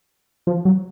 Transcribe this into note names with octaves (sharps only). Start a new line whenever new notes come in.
F3
F#3